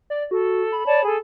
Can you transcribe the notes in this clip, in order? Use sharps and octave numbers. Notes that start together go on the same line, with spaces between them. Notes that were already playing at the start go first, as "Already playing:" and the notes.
D5
F#4 A4
B5
C#5 D5 A5
G#4 A4